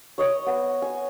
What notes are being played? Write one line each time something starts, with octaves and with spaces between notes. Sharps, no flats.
C#5 D#5 D#6
B3
G#5